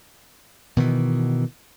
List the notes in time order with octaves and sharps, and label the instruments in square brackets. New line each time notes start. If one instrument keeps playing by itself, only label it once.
[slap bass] B2 D#3 E3